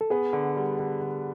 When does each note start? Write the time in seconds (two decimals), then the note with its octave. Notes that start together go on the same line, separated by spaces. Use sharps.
0.01 A4
0.10 B3 G#4
0.33 D3
0.56 G3
0.79 D3
1.01 D3